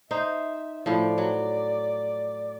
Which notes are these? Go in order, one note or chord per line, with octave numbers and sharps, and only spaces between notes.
D#4 C5 E5
A2 F3 D5
F#3